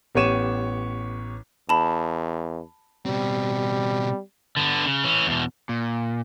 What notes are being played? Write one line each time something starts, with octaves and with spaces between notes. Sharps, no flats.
A1 B3 G4 C#5 D#7 E7
E2 A5 B5
B2 G3 C4
D3 B3
C#3
E3 C#4
E2 B2
A#2